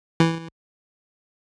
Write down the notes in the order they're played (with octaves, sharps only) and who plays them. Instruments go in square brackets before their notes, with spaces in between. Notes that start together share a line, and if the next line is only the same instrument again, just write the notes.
[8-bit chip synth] E3